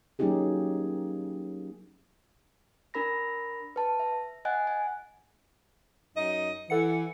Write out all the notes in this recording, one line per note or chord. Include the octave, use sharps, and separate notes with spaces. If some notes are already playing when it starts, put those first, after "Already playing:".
F#3 A#3 C#4 D#4 G4 G#4
D4 A#4 B5 A#6
B4 A5
E5
D#5 F#5 G#5 F#6
G#5
F#2 D#4 D#5
E3 A4 F#5 C#7